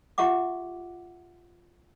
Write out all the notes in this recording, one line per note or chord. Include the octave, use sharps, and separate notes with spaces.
F4 G4 E5 F#5 D6